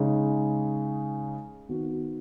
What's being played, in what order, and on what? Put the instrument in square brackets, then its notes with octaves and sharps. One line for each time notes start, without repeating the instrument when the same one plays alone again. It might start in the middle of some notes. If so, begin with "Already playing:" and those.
Already playing: [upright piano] C#3 G#3 D#4
D#3 B3 F#4